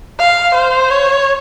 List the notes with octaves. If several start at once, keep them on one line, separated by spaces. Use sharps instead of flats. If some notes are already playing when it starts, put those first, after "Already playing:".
F5
C5
C#5